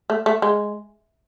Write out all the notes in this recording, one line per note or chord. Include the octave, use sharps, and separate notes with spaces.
A3
A3
G#3